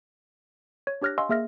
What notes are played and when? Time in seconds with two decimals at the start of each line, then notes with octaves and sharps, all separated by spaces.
0.87 C#5
1.02 D4 G4 C#5 F6 F#6 A#6
1.18 D#5 F5 G#5 C6 C#6 E6
1.29 A#3 G#4 E5 F6 A#6